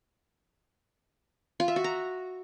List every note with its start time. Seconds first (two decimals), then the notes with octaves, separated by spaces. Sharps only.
1.60 F4
1.68 E5
1.76 F#4
1.84 A#5